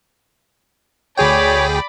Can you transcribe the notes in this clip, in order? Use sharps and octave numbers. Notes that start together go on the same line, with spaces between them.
D2 G#4 C#5 D5 G5 B5